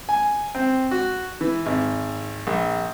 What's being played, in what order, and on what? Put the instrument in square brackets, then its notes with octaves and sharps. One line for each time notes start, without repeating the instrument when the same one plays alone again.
[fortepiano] G#5
C4
F#4
E3
G#1
A#1